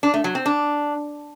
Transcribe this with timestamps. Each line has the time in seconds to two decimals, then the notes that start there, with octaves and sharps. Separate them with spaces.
0.03 D4
0.14 A3
0.24 F#3
0.35 C4
0.46 D4